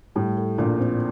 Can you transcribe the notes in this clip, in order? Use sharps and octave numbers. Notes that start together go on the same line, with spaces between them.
A2 G3
A4
A#1 A#2 F4
C4